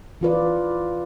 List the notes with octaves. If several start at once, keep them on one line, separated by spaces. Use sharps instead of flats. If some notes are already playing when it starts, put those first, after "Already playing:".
E3 F4 B4 D5